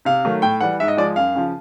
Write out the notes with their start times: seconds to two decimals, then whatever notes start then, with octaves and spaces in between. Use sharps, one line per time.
0.05 C3 F5
0.25 D#3 F#3 A3
0.42 A2 G5
0.61 E3 G3 F#5
0.80 G#2 E5
0.88 D#5
0.97 F3 G#3 D5
1.16 F#2 F5
1.35 C#3 F3